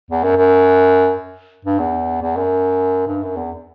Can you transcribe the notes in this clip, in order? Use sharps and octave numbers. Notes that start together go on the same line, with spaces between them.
E2
F#2
F#2
G2
E2
E2
F#2
G2
F#2
E2